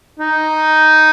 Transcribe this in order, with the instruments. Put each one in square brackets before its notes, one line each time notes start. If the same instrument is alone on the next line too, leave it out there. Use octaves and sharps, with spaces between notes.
[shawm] D#4